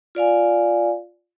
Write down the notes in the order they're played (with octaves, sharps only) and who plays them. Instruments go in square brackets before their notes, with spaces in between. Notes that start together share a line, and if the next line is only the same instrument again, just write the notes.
[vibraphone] F4 D5 F5 G#5